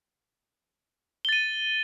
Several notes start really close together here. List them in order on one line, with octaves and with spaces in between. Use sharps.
G7 A6 D#7